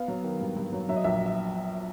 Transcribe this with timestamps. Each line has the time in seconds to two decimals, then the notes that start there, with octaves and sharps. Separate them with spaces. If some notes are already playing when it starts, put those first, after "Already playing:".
Already playing: B3 F5
0.08 F#3
0.24 D#3
0.41 G2
0.56 G2
0.73 F#3
0.89 F#3 E5
0.96 D#5
1.04 A#1 E5
1.26 E5